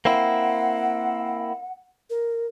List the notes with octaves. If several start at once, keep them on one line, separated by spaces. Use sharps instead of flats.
A#3 C4 E4 F#5
A#4